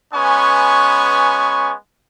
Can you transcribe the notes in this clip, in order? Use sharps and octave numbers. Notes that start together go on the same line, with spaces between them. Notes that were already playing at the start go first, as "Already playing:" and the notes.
G#3 B3 C#4 B4 G#5 C#6